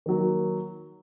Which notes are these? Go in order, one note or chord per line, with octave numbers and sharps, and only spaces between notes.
D#3 F#3 A#3